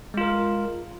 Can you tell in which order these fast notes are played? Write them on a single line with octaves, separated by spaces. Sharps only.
G#3 F4 A#4